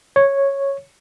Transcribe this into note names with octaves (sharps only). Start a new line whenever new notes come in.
C#5